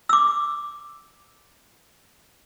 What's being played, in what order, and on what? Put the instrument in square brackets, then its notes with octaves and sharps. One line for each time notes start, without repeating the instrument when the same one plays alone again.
[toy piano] D6 E6